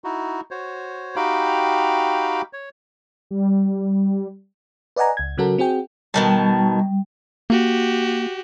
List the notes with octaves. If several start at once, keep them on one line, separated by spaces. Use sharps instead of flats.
D#4 E4 F#4
F#4 C5 C#5
D#4 F#4 G4 F5 G5 B5
C#5
G3
B4 D5 D#5 F#5 G#5 A#5
C#2 G#6
C#3 F#3 C#4 F#4 A4 A#4
C4 F#4 G#4 G5
B2 D#3 G3 A5
A#3 F#4 G4